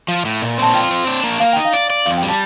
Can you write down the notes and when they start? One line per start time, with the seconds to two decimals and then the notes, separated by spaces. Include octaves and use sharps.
0.08 F3
0.25 A2
0.42 A#2
0.58 C4 A5
0.74 F4 G5
0.91 C4
1.07 D4
1.24 A#3
1.40 A#3 F5
1.53 D#4 G5
1.65 F5
1.73 D5
1.90 D5
2.06 F2 F5
2.18 G5
2.23 G3
2.28 A5